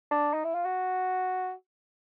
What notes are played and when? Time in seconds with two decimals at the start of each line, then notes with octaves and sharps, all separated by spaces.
0.11 D4
0.34 D#4
0.44 E4
0.55 F4
0.65 F#4